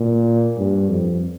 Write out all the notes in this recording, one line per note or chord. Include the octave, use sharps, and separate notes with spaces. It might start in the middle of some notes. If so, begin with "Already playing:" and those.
Already playing: A#2
G2
F2